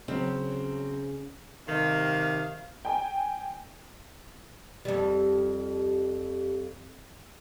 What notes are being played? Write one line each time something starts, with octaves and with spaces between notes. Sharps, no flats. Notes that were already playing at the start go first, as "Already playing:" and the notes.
C#3 F#3 C4
C3 D#3 F5
G5 G#5
F2 G3 G4